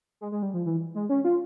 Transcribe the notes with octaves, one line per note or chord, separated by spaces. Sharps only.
G#3
G#3
G3
F3
E3
G#3
C#4
F4